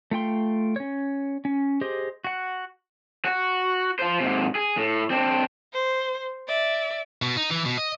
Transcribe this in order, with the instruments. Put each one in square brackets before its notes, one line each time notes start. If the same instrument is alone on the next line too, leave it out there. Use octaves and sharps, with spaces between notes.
[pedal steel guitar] A3 F4 G5 C6
C#4 C#5
C#4
G4 G#4 C5 D#5
F#4 F#5
[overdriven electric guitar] F#4
F4 C5
G#2 C3
G#4
A2
C4 D4
[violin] C5
D5 E5
[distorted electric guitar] B2
D#4
E3
B2
D#5